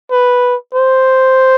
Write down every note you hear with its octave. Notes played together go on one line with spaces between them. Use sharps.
B4
C5